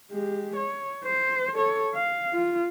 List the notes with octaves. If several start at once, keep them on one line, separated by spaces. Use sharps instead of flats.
G#3 G4
C#5
C5
A4 C#5
F5
F4